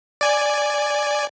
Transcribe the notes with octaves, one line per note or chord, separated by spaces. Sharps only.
D5 G#5